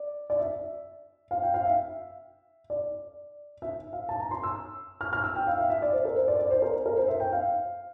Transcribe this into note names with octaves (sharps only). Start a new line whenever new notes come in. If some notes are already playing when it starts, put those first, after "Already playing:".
Already playing: D5
D5
E5
F5
G5
F5
E5
D5
E5
F5
A5
A#5
C6
E6
F6
F6
E6
G5
F5
E5
E5
D5
C5
A#4
C5
D5
D5
C5
A#4
A#4
C5
E5
G5
F5